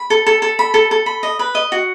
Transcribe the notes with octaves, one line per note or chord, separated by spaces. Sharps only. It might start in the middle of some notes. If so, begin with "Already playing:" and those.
Already playing: B5
A4
A4
A4
B5
A4
A4
B5
D#5
B4
D#5
F#4